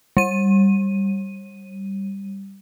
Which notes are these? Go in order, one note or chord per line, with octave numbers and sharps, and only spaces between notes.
G3 D#7